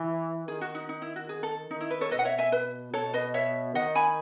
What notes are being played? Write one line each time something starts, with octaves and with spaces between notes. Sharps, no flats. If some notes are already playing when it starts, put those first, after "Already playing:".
Already playing: E3
D#3 G#4
F#4
D#4
D#4
E4
F#4
G#4
A4
D#3 D#4
E4
B4
A4 C#5
B2 B4 D#5
F#5
C#5 E5
E5 G#5
B4
B2 A4 C#5
B4 D#5
C#5 E5
D#3 D#5 F#5
G#5 B5